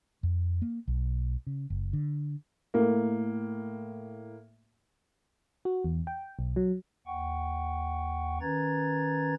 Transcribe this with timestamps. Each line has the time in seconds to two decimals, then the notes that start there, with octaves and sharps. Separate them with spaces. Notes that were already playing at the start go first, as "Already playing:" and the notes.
0.23 F2
0.62 A#3
0.88 B1
1.47 C#3
1.70 F#1
1.93 D3
2.74 A2 A#3
5.65 F#4
5.84 E2
6.07 G5
6.39 B1
6.56 F#3
7.07 D#2 F#5 G5 C#6
8.41 D#3 C#4 B4 A#5 G#6 A6